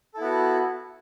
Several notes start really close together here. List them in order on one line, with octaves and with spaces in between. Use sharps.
A4 E4 B3 F#4